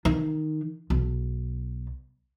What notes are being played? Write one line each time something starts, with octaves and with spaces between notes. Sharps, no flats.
D#3
B1